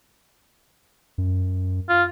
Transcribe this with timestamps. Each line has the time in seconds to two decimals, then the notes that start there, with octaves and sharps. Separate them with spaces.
1.18 F#2
1.89 F4